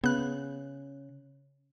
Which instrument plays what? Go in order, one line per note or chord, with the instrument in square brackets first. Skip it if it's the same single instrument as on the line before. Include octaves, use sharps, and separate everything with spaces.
[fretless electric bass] C#3 [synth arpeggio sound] B3 F#6